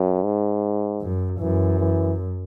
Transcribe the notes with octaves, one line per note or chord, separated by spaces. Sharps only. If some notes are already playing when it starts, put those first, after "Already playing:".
Already playing: F#2
G#2
F#2
F#2 E3
E3